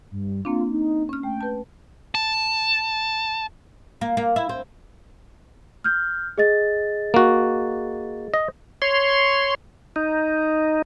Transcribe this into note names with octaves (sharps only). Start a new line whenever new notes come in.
G2
A#3 C4 D4 F4
D#4
C#4 F6
A3 G5
B4 A5
A5
A#3
A#3
E4
C4
F6 G6
G#4 D#5 A6
A#3 F#4
D#5
C#5 C6
D#4